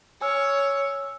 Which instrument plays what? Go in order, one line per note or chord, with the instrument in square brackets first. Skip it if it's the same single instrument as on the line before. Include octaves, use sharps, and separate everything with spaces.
[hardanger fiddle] C#5 [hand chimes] G#5 E6 F6